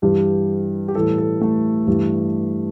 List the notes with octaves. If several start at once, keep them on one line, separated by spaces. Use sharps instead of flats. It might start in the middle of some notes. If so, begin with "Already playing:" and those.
G2 E3 G3 G4
G4
A2 E3 G3 A4
A4
A3
G2 E3 G3